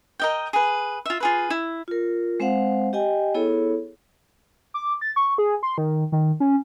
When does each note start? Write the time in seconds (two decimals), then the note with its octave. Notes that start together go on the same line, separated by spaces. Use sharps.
0.20 A#4 D#5 G5
0.53 G#4 B4
1.06 F4 E5
1.20 F4 G#4 B4
1.50 E4
1.88 F4 A#4
2.40 G#3 C4 C5 F5 F#5
2.93 G4 D#5 G5 G#5
3.34 B3 E4 G#4 A4 C#5
4.74 D6
5.01 A6
5.16 C#6
5.38 G#4
5.63 C6
5.78 D#3
6.12 D#3
6.40 C#4